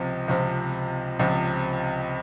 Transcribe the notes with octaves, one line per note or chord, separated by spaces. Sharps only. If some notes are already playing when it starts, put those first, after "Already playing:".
Already playing: C#2 C3 F3
C#2 C3 F3 C4
C#2 C3 F3 C4